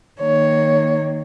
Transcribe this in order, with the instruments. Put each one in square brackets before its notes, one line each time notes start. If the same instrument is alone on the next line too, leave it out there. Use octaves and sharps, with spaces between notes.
[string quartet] D#3 A#3 C#5